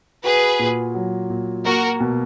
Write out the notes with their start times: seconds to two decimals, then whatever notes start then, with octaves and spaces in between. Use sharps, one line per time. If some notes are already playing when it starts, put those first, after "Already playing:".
0.24 F#4 G#4 B4
0.59 A#2
0.94 F#3
1.30 A#2
1.65 A#3 F#4 A#4
2.00 B2